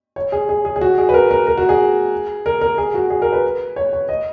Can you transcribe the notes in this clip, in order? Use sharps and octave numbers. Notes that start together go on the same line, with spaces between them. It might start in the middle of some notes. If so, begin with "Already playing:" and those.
C#5
G#4
G#4
G#4
G#4
F#4
G#4
B4
A#4
A#4
A#4
F#4
G#4
A#4
A#4
G#4
F#4
G#4
A#4
B4
C#5
C#5
D#5